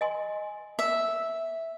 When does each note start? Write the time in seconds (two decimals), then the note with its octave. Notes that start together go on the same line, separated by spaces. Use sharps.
0.01 D#5 G#5 C6
0.79 E5